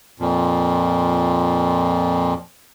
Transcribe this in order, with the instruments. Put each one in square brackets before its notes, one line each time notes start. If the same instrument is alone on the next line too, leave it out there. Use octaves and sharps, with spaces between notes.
[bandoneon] F2 A#2